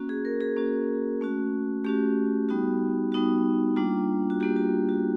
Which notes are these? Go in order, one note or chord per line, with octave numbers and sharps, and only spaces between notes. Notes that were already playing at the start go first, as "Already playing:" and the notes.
Already playing: A#3 C#4 F#4
G#4
A#4
G#4
A#3 C#4 F#4
A3 C#4 F#4
A3 C#4 F#4 G4
G3 B3 D#4 F#4
G3 B3 D#4 F#4
G3 A#3 D4 F4
F#4
G3 A#3 D4 F4 G4
F#4
F#4